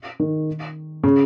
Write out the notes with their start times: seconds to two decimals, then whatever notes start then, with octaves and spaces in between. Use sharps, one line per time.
0.20 D#3
1.04 C#3